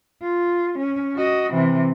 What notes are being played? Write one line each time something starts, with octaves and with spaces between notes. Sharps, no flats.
F4
C#4
F#4 D#5
C3 E3